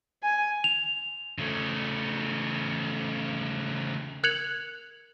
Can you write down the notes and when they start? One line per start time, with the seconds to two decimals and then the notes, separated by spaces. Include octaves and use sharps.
0.23 G#5
0.64 F7
1.38 C#3 A3
4.23 A#4 F#6 G#6 C#7 F7 F#7